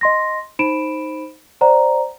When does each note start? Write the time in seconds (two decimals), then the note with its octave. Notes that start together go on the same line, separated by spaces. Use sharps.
0.01 D#5 C6 A#6
0.59 D#4 C5 B5 D7 E7
1.61 C5 D5 F#5 A#5